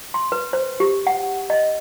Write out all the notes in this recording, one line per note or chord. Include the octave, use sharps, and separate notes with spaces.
C6
B4
C5
G4
F#5
D#5